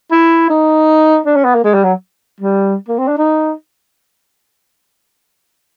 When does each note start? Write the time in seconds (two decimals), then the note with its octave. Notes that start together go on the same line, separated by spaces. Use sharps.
0.11 E4
0.50 D#4
1.26 D4
1.36 C#4
1.45 B3
1.55 A#3
1.64 G#3
1.74 G3
1.84 F#3
2.41 G3
2.88 A#3
2.98 C4
3.08 D4
3.18 D#4